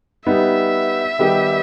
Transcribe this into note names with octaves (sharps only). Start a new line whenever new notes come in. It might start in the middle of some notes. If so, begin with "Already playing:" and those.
G3 B3 D#4 E5
D#3 G3 B3 D#4 G4